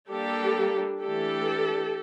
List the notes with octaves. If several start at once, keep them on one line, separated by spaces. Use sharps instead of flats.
G3 A#3 D4 G4 A4
E3 A3 D4 G4 A4